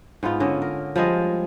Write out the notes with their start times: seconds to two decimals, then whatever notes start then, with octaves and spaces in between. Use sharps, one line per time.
0.23 G#2 B3 D#4 F4
0.40 D3 C#4 D#5
0.62 A#4
0.96 F3 G3 G#3 D#5